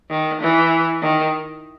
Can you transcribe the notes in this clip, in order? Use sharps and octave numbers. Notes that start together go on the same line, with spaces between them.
D#3
E3
D#3